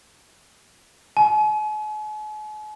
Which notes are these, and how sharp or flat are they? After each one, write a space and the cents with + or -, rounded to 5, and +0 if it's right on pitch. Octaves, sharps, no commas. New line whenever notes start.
G#5 +45